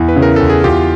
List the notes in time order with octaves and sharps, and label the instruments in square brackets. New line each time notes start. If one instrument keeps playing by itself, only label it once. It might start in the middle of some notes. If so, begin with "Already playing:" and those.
Already playing: [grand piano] E2 E4
[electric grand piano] B4
[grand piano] C#3
[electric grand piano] A#4
[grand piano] E2 [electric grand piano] A4
[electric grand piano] G#4
[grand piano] E2 [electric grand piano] F4 G4